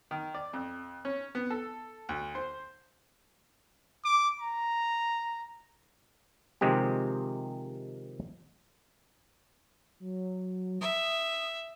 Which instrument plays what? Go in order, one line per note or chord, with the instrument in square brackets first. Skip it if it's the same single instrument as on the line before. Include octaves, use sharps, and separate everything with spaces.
[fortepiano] D#3
D5
F2
C#4
B3
A4
D2
C5
[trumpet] D6
A#5
[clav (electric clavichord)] C3 D#3 F3 G#3 C4 G4
[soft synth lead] F#3
[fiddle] E5 [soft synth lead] D#6